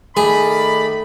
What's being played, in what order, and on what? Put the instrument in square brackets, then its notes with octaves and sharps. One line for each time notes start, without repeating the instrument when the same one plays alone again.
[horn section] D#3 D5 B5 [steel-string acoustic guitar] A3 [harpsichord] G#4